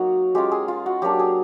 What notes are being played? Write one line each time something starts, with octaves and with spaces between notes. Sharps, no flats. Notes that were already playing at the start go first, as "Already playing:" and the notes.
Already playing: F#3 A#3 D#4 F#4
G#3 C#4 F4 G4
G#4
F4
F#4
F#3 A#3 D4 G4
G#4